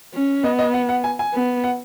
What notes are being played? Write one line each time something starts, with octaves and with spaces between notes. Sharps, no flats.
C#4
B3 D#5
D#5
F#5
F#5
G#5
G#5
B3
F#5